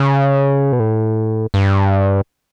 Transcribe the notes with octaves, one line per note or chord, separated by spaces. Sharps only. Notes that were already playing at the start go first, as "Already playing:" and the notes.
Already playing: C#3
B2
A2
G2